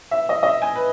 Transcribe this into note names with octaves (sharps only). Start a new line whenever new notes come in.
E5
D#5
D#5
E5
G#5
B4